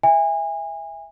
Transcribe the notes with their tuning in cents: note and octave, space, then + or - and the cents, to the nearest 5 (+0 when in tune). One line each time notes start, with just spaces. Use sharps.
E5 +0 G#5 -30